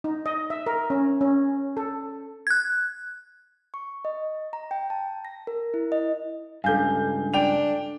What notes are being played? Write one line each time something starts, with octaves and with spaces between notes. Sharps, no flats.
D#4
D#5
E5
A#4
C#4
C#4
A4
F#6 G#6
C#6
D#5
A#5
G5
A5
A#6
A#4
E4
D#5
C#2 G2 A4 F5 G#5 G6
D4 G5 F7